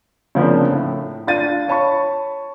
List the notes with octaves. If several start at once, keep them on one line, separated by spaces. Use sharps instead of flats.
C#3 F3 A#3 C4 D4
A2
D4 F4 A6 D#7
C#5 A5 B5 C#6